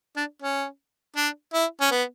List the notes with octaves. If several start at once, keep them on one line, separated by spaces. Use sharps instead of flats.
D4
C#4
D4
E4
C#4
B3